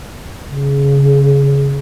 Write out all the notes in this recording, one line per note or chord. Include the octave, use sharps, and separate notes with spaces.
C#3